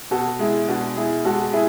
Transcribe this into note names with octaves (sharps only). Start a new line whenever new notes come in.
B2 F#4 A4
G#3 E4 G#4
B2 D4 F#4
G#3 E4 G#4
G#3 F#4 A4
E4 G#4